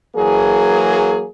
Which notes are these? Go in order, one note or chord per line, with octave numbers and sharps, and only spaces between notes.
E3 F#3 A#3 G#4